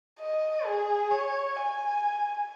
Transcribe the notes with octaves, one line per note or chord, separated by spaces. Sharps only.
D#5
G#4
C#5
G#5